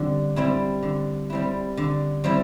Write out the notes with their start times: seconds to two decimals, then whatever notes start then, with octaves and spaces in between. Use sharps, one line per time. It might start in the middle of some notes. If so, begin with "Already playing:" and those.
Already playing: D3 G3 C4
0.36 G3 C4 E4
0.83 D3
1.30 G3 C4 E4
1.77 D3
2.24 G3 C4 E4